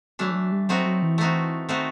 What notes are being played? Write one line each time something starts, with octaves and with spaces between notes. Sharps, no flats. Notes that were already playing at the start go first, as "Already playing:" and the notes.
E3 F#3 A3 D4
F3
F#3
G3
F#3 A3 C4 D#4 F#4
F#3
E3
A3 C4 D#4 F#4
D#3 A3 C4 D#4 F#4